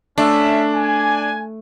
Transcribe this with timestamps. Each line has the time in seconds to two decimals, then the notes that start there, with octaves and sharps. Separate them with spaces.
0.18 A3 C#4 D4 E5
0.74 G#5